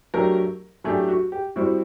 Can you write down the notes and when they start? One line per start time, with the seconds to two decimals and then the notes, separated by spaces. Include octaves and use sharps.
0.14 F#3 A3 D4 G4 A#4
0.84 F#3 A3 D4 G4 G#4
1.08 F#4
1.32 G4
1.56 G3 C4 E4 F#4